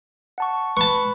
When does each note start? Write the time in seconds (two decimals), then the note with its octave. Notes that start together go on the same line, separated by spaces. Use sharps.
0.38 F#5 A5 C#6
0.77 B4 A5 B5 C#6